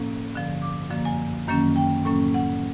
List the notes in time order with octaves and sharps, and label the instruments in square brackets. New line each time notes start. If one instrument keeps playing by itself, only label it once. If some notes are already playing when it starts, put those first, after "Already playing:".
Already playing: [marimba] A2 F3 A#3 C#4
G2 D3 F3
D6
F#2 D3 F3 A#3
G#5
F#2 D#3 F#3 A#3 C#4
G5
A2 F#3 A#3 C#4
F#5